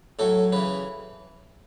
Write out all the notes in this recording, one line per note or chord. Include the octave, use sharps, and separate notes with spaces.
A2 F#3 A4
C#3 E3 B4